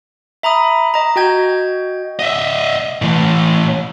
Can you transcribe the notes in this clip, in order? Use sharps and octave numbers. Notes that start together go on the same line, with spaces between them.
E5 A#5 B5 D#6
D#5 A#5
F#4 D#5 G5 G6 G#6
D#5 E5
A2 E3